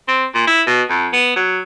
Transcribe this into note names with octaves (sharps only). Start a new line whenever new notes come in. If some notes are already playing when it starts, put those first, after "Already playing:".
C4
A#2
E4
B2
F2
B3
F#3